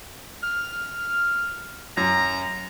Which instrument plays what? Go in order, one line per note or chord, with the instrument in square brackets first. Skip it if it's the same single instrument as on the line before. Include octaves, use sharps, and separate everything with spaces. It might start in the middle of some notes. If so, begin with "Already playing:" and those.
[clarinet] F6
[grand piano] F#2 [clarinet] A#5